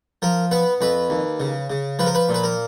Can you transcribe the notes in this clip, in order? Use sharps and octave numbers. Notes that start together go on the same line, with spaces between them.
F3 A#4
B3 B4
F2 B4
D#2
C#3
C#3
F3 B4
A#4
B4
A#2
B4
A#4